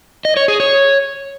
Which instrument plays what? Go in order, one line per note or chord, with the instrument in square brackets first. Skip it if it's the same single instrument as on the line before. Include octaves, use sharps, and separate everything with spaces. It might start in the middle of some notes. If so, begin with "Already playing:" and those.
[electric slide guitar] D#5
C#5
G#4
C#5